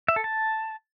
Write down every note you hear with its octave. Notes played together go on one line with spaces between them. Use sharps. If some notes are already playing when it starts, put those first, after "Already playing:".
E5
A4
A5